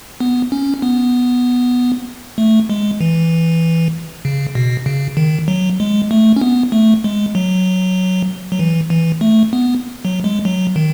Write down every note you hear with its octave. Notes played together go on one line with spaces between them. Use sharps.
B3
C#4
B3
A3
G#3
E3
C#3
B2
C#3
D#3
F#3
G#3
A3
C#4
B3
A3
G#3
F#3
F#3
E3
E3
A3
B3
F#3
G#3
F#3
D#3